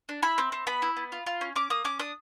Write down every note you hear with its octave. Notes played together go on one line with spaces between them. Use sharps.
D4
E4 B5
C4
C4
B3 B5
E4
B3
F4
F4
C#4
C#4 D6
A#3 D#6
C#4 D6
D4 D#6